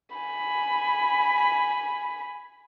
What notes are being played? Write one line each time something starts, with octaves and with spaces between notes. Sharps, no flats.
G#5 B5